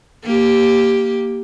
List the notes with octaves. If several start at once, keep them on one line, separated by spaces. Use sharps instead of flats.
A#3 G4